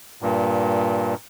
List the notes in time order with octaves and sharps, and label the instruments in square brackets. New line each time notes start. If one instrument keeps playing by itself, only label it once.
[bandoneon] G2 A#2